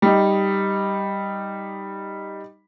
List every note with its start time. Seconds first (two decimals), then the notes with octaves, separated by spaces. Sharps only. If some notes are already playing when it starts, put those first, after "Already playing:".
0.02 G3 D#4